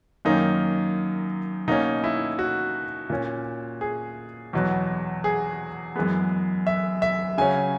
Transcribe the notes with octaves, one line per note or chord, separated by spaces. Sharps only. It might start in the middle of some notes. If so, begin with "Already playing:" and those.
F#2 D#3 A#3 C#4 D#4
B2 A#3 C#4 D#4
E4
F#4
A#2 A#3 C#4
G#4
E2 B2 F#3 B3
G#4
F#2 E3 G#3 B3
E5
E5
C#3 F#3 C#4 G#5